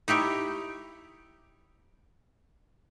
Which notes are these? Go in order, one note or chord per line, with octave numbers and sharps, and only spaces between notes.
D#4 E4 G4 C#5